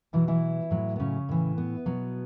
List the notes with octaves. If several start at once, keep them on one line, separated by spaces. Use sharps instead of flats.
B2 E3 F#3 E4
E3 E4
A2 F#3
B3
C#3 C#4
A2 E3
B3
B2 F#3